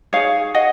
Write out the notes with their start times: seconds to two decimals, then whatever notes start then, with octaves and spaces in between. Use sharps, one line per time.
0.13 D#4 G#4 C#5 F5
0.55 D#5 F#5